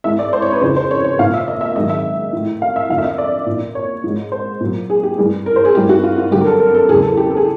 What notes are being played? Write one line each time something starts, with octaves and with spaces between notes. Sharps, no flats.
G#2 E3 E5
D5
C5
C#5
B4
F2 C#3 E3 C5
C5
C#5
C#5
A#2 F3 F5
E5
D#5
E5
G#2 D#3 F#3 D#5
E5
A2 F3
F5
E5
F2 D3 F3 F5
E5
D#5
D5
A#2
F3
C#5
G#2 F3
C5
A#2 F#3
G#4
G4
G2 E3 G#4
A#4
C5
G#4
G2 E3 G4
F#4
F4
F4
G2 D3 F#3 G4
A#4
A4
A#4
A4
E2 C#3 F#3 G#4
A4
G4
A4
G#4